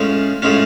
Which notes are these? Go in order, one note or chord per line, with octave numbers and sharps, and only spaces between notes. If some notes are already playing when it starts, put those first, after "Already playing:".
Already playing: A2 G#3 C#4 F4
A2 G#3 C#4 F4